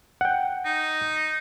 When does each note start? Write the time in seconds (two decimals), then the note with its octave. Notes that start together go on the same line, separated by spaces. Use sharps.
0.21 F#5 G5
0.65 D#4